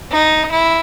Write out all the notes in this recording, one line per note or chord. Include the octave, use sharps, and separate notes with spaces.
D#4
E4